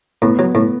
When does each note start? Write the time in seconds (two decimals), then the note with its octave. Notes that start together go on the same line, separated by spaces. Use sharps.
0.22 A2 B3
0.39 F#3
0.55 A2